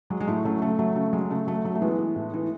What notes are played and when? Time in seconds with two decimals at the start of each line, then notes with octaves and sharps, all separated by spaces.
0.10 F#3 G#3
0.20 G#3
0.27 A2 A3
0.45 F#3 A3 C#4
0.62 C#3 A3
0.79 F#3 A3
0.96 C#3 A3
1.13 F#3 G#3
1.30 C#3 A3
1.47 F#3 A3
1.64 F#3 A3
1.75 A3
1.81 E3 G#3 B3
1.98 E3
2.16 A2
2.34 E3